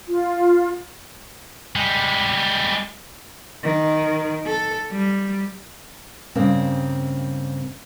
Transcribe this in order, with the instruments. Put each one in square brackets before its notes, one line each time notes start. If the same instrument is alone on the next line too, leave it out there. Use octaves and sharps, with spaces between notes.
[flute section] F4
[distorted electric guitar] G3 G#3
[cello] D#3
A4
G3
[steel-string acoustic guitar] G2 C#3 A#3 C4